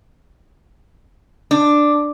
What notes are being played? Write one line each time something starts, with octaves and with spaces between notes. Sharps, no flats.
D4